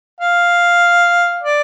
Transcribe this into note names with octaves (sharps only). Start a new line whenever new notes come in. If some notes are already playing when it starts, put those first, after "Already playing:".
F5
D5